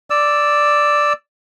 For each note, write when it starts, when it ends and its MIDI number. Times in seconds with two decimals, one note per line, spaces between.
0.10 1.13 74
0.10 1.13 88